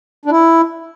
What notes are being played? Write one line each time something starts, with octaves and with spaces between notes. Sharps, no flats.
D4
E4